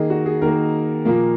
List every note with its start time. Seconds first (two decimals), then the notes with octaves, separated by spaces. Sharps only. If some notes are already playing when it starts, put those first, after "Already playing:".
Already playing: D#3 A#3 G#4 D#5
0.10 F#4
0.26 G#4
0.42 D#3 A#3 A#4
1.05 A#2 F3 A#3